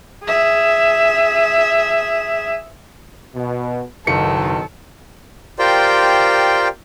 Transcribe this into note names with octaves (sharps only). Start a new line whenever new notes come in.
G#4 E5
B2
F#1 B2 D#3 A4 C#7
F4 G4 A#4 C5 D5 G5